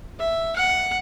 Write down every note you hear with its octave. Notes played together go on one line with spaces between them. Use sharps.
E5
F#5